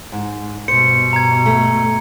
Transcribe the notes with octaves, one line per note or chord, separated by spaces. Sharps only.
G#2
G2 B2 C5 C#7
A#5 G#6
A3